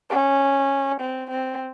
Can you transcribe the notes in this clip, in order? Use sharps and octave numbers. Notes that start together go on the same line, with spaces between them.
C#4
C4
C4